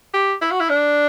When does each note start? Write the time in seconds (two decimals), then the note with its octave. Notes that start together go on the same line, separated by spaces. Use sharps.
0.14 G4
0.42 E4
0.51 F#4
0.60 E4
0.69 D4